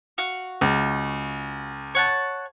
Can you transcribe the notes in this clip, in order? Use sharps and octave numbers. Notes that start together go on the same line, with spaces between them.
F#4 F5
C#2
C#5 F#5 A5